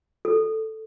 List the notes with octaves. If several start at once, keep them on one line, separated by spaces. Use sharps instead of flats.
A4